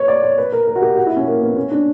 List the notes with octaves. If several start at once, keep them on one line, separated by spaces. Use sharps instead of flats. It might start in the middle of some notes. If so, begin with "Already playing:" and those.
Already playing: B4 C#5
D5
C#5
B4
A#4
A#4
F#4
G4
F#4
E4
C#4
A#3
B3
C#4
D4